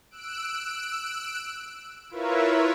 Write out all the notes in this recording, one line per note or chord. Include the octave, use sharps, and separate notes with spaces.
E6 F#6 D7
E4 F4 A#4 B4 C#5 E5